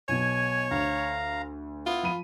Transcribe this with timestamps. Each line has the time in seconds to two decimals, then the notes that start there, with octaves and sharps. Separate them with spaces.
0.09 B1 B2 C#5 G#5
0.71 D2 F5 A#5
1.86 B3 E4 F4
2.03 F3 B5 D#7